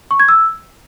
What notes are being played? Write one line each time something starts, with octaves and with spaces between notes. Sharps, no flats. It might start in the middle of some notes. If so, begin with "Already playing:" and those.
C#6
G#6
E6